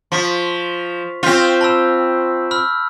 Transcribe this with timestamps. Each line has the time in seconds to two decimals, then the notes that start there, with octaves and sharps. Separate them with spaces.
0.12 F3 C6 C#6 B6
1.23 C4 F4 C#6 G6 B6
1.61 A5 B5 E6
2.51 B5 E6 F6